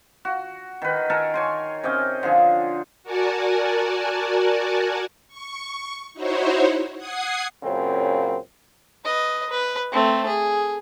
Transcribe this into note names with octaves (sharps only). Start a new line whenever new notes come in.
F#4
D#3 B4
A4 A#4 G#5 A5
C#5 G#5 C6
C3 C#4 D#5 G5
D3 F3 G#4
F#4 A#4 D5 F#5 G#5 A5
C#6
D#4 E4 F#4 C5 C#5
F#5 D#6 G#6 C7
F#2 A#2 C#3 C4
B4 D#5
B4
A3 C4
G#4